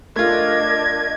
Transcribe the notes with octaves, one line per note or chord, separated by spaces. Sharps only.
A3 D4 F4 A#4 D#5 G#6